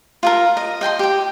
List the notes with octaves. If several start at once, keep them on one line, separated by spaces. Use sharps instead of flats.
F4 G#4 A#4
D#5
D#5 G5 G#5 C6
G4 G5